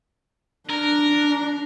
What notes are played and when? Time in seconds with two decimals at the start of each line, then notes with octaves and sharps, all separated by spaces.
0.70 D4 A#4